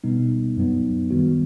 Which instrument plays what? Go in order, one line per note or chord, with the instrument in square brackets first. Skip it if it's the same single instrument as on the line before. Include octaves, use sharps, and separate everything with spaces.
[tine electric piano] B2 G3 B3 D#4
F#2 F#3 B3 D#4
D#3 G3 B3 F#4